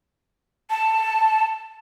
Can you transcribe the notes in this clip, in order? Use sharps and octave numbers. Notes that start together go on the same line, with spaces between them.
A5